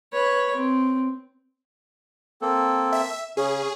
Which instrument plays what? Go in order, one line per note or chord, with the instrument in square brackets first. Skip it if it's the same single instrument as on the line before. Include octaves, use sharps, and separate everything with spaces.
[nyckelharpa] B4 C#5
C4
[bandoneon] A#3 C4 A4
[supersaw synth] E5
[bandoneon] C#3 C#4 [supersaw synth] G#4